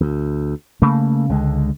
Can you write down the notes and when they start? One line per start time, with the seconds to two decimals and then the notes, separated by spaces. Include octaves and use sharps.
0.01 D2
0.82 C#3 A3 A#3
1.29 C#2 D3 G#3